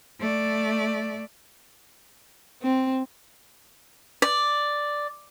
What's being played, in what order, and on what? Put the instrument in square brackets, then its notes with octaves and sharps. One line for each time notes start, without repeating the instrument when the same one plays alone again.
[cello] A3 D5
[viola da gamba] C4
[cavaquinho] D5